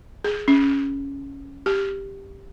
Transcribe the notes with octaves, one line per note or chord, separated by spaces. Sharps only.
G#4
C#4
G4